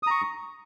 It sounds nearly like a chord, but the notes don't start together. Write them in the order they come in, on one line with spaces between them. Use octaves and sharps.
D#6 A#5 C#6